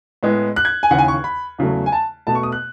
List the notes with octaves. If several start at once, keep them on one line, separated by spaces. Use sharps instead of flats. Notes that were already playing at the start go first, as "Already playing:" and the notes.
A2 G#3 B3
F#6
G#6
G#5
D#2 C#3 E3 F#5
G#5
C#6
B5
E2 C#3 F#3 A3
G#5
A5
B2 A3 A5
C#6
D#6
F#6